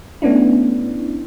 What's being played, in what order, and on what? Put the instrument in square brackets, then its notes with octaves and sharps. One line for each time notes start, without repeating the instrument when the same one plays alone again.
[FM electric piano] A3 B3 C#4 D4 E4